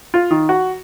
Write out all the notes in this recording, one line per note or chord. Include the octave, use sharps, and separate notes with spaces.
F4
D#3
F#4